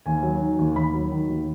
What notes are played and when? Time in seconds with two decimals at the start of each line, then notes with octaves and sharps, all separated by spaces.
0.06 D#2 G#5
0.23 F#3
0.40 D#3
0.58 D#2
0.75 D#2 B5
0.94 F#3
1.11 D#3
1.29 D#2